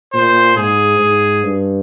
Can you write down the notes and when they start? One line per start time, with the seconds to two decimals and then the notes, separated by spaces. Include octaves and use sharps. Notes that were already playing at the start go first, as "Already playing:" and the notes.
0.13 A#2 C5
0.56 G#2 G#4
0.99 G#2
1.43 G2